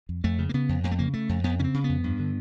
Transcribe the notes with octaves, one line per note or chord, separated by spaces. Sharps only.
F2
F2 A3
C#3
A#3
C#3 B3
F2
F2 A#3
A3
C#3 A#3
C#3 A3
F2
F2 B3
C#3 C#4
C4
C#3
F2 B3
G2
D3